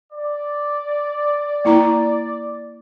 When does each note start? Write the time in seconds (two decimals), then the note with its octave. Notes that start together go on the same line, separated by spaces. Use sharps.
0.13 D5
1.65 A#3 E4 A#5